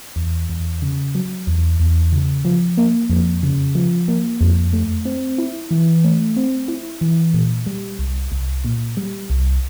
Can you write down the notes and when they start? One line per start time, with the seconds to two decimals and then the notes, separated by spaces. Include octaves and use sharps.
0.16 E2
0.49 E2
0.82 C#3
1.15 F#3
1.47 E2
1.80 E2
2.12 C#3
2.45 F3
2.77 A#3
3.10 F2
3.43 C#3
3.75 F3
4.08 A#3
4.41 F2
4.73 A3
5.05 C4
5.38 E4
5.71 E3
6.04 A3
6.36 C4
6.68 E4
7.01 E3
7.34 A#2
7.66 G3
7.99 C2
8.32 C2
8.65 A#2
8.97 G3
9.30 C2